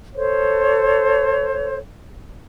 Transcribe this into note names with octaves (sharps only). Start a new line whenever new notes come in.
A4 C5 C#5